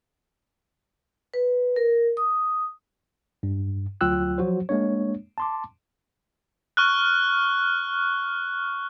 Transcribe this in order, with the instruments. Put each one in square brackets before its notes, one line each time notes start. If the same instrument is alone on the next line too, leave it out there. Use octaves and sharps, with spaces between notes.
[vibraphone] B4
A#4
D#6
[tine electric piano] G2
D2 F#3 F4 G5 E6 F#6
F3 F#3 F#4 C5
G#3 A#3 D4 C#5
A5 C6 D6
[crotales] C#6 F6 F#6